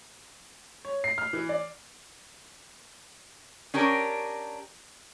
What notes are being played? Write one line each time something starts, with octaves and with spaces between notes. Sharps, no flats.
C#5
C7
F6
E3
D5
C#4 D4 G4 A#4